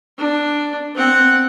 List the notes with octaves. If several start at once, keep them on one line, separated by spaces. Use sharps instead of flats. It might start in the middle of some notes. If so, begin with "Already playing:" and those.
D4
C4 F#5